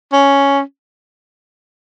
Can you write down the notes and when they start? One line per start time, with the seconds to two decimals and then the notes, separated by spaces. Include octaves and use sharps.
0.13 C#4